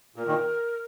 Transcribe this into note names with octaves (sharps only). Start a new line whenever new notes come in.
A#2 A#4
A#2 D#3